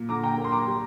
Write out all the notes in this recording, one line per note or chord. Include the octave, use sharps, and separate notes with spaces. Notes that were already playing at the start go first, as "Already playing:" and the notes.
Already playing: A#2
D3 A#5 D6
G5 A#5
A#3
C6
A#5 D6
G3